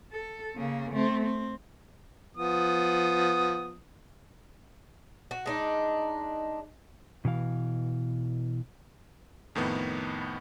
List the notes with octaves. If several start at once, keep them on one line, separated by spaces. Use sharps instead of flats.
A4
C#3 A#3
A3 C4
C4
F3 B3 D#6
F#4
G#3 D4 D#4
B2 E3 F5
F2 A2 D#3 B3